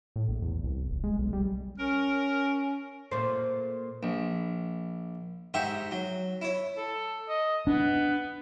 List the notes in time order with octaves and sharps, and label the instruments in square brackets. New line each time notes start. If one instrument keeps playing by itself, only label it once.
[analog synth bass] A2
A#1
E2
C2
D#1
G#3
B1
G3
[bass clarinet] C#4 [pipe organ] A#4
[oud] A#2 A3 [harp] C5
[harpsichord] A#1
G#2 G4 E5 F#5 C#6
F#3
E4 C#5
[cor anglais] A4
D#5
[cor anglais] B3 [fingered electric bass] D4